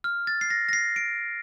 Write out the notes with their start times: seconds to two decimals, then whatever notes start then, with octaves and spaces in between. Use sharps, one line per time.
0.04 F6
0.27 A6
0.41 C7
0.50 A#6
0.69 A#6
0.73 C7
0.96 D7